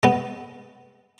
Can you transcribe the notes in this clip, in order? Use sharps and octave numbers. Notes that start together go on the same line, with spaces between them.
G#3 B3